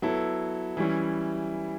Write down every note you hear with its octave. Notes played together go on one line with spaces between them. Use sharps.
F#3 B3 E4 A4
E3 G3 C#4 E4